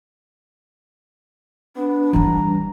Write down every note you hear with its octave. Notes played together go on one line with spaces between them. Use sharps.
B3 D4
E3 G3 A#5